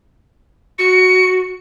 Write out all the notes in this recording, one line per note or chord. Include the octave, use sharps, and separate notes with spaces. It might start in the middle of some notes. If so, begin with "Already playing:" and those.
F#4 C#7